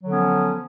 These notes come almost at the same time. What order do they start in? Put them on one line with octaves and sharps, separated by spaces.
F#3 D3 C#4 B3 F3